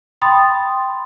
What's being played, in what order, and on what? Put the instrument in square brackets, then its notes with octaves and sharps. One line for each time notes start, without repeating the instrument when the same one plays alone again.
[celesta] G5 B5 C6 D#6 A6